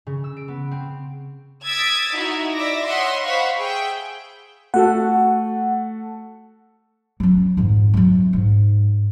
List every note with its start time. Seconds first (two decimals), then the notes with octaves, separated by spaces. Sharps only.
0.07 C#3
0.24 E6
0.37 D7
0.48 B3
0.71 C4
1.66 D#6 E6 G#6 A6 B6 D7
2.14 D#4 E4 F#4 E5
2.54 D5 E5 D6 A#6
2.85 C#5 D#5 E5 F#5 B5 C6
3.24 C5 F5 F#5 B5 C#6
3.57 G#4 E5 G5
4.74 A3 F#4 A4 F#5
7.20 F#3 C#4
7.57 F2 G#2
7.94 C3 F#3
8.33 G#2